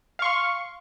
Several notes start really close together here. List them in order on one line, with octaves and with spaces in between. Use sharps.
F5 C#6 C6